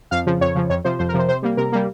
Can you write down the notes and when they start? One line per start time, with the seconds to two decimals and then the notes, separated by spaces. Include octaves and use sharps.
0.11 F2 F5
0.26 C#3 F3
0.41 F2 C#5
0.55 C#3 F3
0.70 F2 C#5
0.84 C3 F3 C5
0.99 F2 C5
1.09 A#4
1.14 C3 F3 C5
1.29 C3 C5
1.43 G3 A#3
1.57 C3 A#4
1.72 G3 A#3